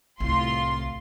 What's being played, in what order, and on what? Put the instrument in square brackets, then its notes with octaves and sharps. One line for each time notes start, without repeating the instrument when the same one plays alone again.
[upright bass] C2 [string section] A2 F4 C6